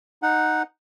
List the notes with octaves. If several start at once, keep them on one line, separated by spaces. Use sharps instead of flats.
D#4 F#5